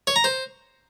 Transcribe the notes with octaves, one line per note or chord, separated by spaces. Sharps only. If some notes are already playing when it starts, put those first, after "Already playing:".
C#5
A#5
C5